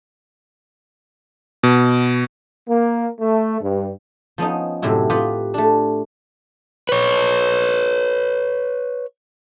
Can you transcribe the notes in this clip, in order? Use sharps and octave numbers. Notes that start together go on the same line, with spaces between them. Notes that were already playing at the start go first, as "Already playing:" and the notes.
B2
A#3
A3
G2
F3 B3 C#4 D#4
F#2 A2 C3 C4 E4 F#4
F4 G4 B4 D#5 F#5
A3 D4
B4 C#5